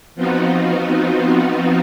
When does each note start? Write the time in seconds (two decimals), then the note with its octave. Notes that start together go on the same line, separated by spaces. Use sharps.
0.15 F3 B3 C4 D#4 F4 F#4